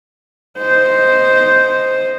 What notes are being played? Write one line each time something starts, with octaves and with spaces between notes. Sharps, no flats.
C5 D#5